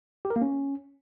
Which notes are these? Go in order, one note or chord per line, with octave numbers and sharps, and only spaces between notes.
G4
A#4
A#3
C#4